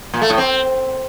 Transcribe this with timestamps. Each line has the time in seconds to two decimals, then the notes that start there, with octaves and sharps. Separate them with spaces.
0.14 A#2
0.22 A3
0.30 A2
0.38 C4